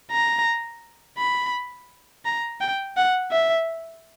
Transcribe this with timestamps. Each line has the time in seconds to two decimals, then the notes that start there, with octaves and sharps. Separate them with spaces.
0.11 A#5
1.17 B5
2.25 A#5
2.61 G5
2.97 F#5
3.31 E5